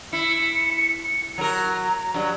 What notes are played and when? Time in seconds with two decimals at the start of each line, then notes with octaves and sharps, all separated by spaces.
0.13 E4 C#7
1.38 F#3 A#4 A#5
2.14 G2 F#3